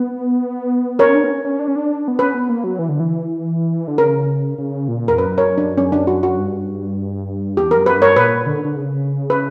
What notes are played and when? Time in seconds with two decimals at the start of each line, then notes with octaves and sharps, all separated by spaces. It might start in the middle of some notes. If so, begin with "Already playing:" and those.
Already playing: B3 B4
0.99 C#4 A#4 C#5
1.15 D4
1.24 B3
1.30 C#4
1.45 C#4
1.59 D4
1.68 C#4
1.76 D4
2.08 B3
2.19 C#4 B4
2.35 B3
2.49 A#3
2.64 F#3
2.79 E3
2.89 D3
3.00 E3
3.87 D3
3.98 C#3 A#4
4.58 C#3
4.88 A#2
5.08 E2 A#4
5.18 F#2 B4
5.38 A#4 C#5
5.58 D4
5.78 C#4
5.92 D4
6.07 F#4
6.23 F#4
6.38 G2
7.56 E2 G4
7.71 A#4
7.77 F#2
7.86 B4
7.97 G2
8.02 A#4 C#5
8.17 A#2 B4
8.46 D3
8.65 D3
8.76 C#3
9.30 B4